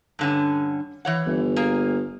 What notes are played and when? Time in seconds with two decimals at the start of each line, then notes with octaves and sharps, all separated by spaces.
0.19 G2 D3 C#4
1.05 E3 C#5 F#5
1.26 G1
1.56 A#3 G#4